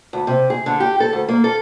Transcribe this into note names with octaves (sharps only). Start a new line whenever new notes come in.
D2
C3
G#4
D3
G4
A4
D2
A#3
A4